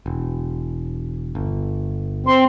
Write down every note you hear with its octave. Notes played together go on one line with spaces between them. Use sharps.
E1
G1
C4 C6